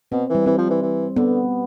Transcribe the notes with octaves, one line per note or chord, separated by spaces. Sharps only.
B2 C4
E3
G3
E3 C4
F3
E3
E3
D3 B3